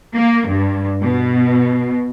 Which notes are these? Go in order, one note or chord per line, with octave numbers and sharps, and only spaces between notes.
A#3
G2
B2